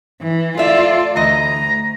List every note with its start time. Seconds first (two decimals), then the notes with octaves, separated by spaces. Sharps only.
0.22 E3
0.57 A3 F4 D5 E5
1.16 D2 E3 D#5 A#5